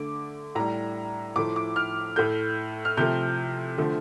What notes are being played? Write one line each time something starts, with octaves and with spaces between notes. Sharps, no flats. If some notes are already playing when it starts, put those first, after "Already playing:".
Already playing: D3 A3 D6
A2 G3 A#5
A2 F3 A3 D6
D6
F6
A2 A3 G6
F6
C3 F3 A3 G6
D3 F3 A3